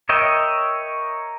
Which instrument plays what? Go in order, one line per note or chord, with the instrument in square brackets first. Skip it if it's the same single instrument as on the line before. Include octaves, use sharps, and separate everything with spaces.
[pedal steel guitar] A#4 C#5 D#5 E5 G5